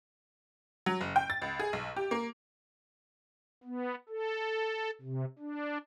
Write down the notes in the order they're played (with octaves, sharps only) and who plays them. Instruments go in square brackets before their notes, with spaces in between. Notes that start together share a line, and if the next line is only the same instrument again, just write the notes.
[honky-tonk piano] F#3
F#1
G5
A6
C#2
G#4
B1
G4
A#3
[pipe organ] B3
A4
C3
D4